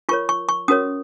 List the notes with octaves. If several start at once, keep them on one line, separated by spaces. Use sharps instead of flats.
F4 A#4 C#5 C#6
C#6
C#6
C#4 F#4 A#4 C#5 D#6